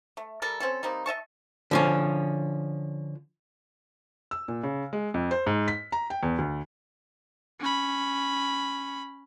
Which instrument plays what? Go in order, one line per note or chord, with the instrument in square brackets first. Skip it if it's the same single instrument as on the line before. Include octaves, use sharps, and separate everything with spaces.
[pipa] A3
G3 A4 A#4
C4 C#4 A4
G3 A#3 C4 D#4
D#5 E5 A5 C#6
[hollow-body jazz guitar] D3 F3 C#4
[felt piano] E6
A#2
C#3
G#3
F2
C5
G#2
B6
A#5
G5
E2
D2
[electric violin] C#4 B5